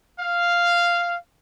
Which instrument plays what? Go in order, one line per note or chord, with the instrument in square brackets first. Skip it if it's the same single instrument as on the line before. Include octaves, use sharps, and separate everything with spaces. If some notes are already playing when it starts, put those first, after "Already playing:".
[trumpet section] F5